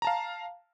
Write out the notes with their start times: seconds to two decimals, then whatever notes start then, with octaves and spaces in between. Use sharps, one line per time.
0.02 A#5
0.05 A5
0.07 F5